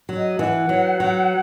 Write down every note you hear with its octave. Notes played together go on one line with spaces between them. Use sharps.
F#3
D#5
E3 F#5
F#3
F#3